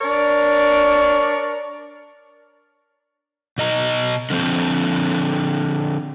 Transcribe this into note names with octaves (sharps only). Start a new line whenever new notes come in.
D4 A#4 C#5 D5
B2 D#5 A#5
D3 F3 C4